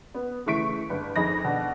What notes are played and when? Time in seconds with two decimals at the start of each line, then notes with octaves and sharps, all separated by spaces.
0.15 B3
0.46 C#3 E3 A3 C#6 B6 D7
0.89 G1 B4
1.16 F2 D#4 G#4 B5 A#6
1.44 B2 D4